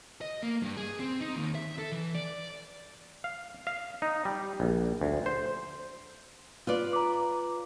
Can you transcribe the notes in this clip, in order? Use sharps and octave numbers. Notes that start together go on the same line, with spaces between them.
D#5
A#3
G2
G#4
C4
D#4
D#2
E5
A4
E3
D5
F5
F5
D#4
G3
A#1
D2
C5
F4 B4 D5
A#5 D6